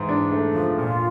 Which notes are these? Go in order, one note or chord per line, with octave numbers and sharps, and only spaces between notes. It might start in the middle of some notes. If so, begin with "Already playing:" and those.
Already playing: G#2 E3
D4
A3
F3
A#2 F4